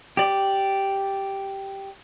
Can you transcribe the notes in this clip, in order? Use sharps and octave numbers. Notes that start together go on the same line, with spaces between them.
G4 D5